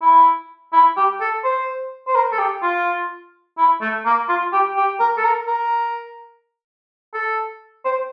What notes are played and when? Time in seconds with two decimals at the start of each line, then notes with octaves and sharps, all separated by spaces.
0.02 E4
0.73 E4
0.97 G4
1.21 A4
1.44 C5
2.08 C5
2.15 A#4
2.32 A4
2.38 G4
2.63 F4
3.58 E4
3.81 A3
4.05 A#3
4.29 F4
4.52 G4
4.76 G4
5.00 A#4
5.17 A4
5.24 A#4
5.47 A#4
7.14 A4
7.85 C5